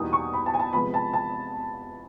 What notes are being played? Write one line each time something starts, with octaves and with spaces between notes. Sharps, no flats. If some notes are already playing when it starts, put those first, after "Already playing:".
Already playing: E2 B2 G3 A#3 D#4 D#6
C#6
B5
A5
G#5
A5
C3 F3 G#3 B3 B5
A5
A5